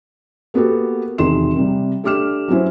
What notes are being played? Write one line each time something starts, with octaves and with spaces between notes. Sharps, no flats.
A#3 B3 F#4 G4 A4
E1 C3 D#3 G#4 C6 E7
C3 G3
A3 D4 G4 D6 F6 E7
F#3 B3 C#4 E4 C5